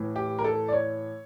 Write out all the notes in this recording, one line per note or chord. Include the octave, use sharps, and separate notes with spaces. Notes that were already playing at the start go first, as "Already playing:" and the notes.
Already playing: A2 E3
G4
A#4
A4
D5
C#5